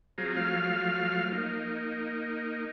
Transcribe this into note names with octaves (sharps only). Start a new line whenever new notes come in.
F#3 C4 F4 G#4 A#5
F3 F#3 A3 F5 F6
A#3 D#4